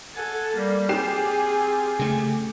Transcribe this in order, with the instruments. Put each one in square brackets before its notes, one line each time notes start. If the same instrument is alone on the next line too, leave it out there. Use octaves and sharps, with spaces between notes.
[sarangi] A4 [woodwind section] F#5 G#5
[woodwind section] G3 [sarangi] A#3
[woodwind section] C4 F4 [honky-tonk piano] G4 C7 E7 [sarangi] G#4
[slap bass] C#3 A3